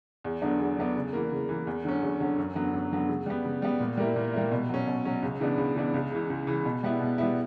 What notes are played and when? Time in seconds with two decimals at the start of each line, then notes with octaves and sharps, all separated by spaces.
0.24 E2
0.42 D3 F#3 B3 D4
0.60 E2
0.77 D3 F#3 B3 D4
0.96 C#3
1.13 E3 A#3
1.31 C#3
1.49 E3 A#3
1.67 E2
1.84 D3 F#3 C#4
2.02 E2
2.20 D3 F#3 C#4
2.38 F#2
2.55 D3 F#3 B3
2.74 F#2
2.91 D3 F#3 B3
3.09 C#3
3.26 G3 B3
3.45 C#3
3.62 G3 B3
3.80 A#2
3.97 G3 A#3 E4
4.16 A#2
4.33 G3 A#3 E4
4.51 B2
4.69 F#3 C#4
4.87 B2
5.05 F#3 C#4
5.23 C#2
5.40 C#3 E3 B3 D4
5.58 C#2
5.76 C#3 E3 B3 D4
5.94 C#2
6.11 C#3 E3
6.30 C#2
6.47 C#3 E3
6.65 B2
6.83 G3 B3 E4
7.01 B2
7.18 G3 B3 E4